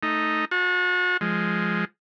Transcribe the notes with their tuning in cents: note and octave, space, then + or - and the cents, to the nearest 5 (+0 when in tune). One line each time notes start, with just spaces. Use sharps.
A3 +0 D#4 +0
F#4 -35 A5 +0
F3 -5 G#3 +0